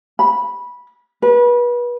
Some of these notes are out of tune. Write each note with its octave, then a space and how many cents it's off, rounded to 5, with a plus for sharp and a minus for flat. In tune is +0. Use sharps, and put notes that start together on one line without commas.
B5 -15
B4 -30